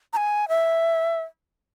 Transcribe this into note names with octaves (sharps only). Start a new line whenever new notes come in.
A#5
G#5
E5